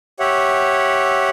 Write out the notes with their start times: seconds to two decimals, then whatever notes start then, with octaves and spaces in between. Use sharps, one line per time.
0.20 G4 C#5 E5 F#5